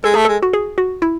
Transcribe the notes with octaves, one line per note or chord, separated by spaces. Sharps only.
G#3 A4
A3 G#4
G#3 A4
F#4
G#4
F#4
E4